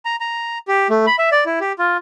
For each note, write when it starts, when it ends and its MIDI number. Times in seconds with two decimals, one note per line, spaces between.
0.05 0.16 82
0.20 0.58 82
0.68 0.88 67
0.90 1.06 57
1.07 1.16 83
1.19 1.29 76
1.32 1.44 74
1.46 1.59 64
1.61 1.72 67
1.79 1.97 65